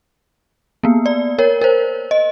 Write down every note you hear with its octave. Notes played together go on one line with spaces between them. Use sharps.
A#3 B3
D5
A#4 C#5
A#4 C5
D#5